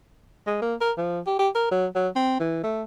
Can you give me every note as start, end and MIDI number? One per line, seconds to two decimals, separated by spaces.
0.47 0.59 56
0.62 0.75 58
0.81 0.92 70
0.97 1.20 53
1.27 1.35 67
1.39 1.49 67
1.55 1.68 70
1.71 1.86 54
1.95 2.08 54
2.15 2.38 60
2.40 2.61 52
2.64 2.83 57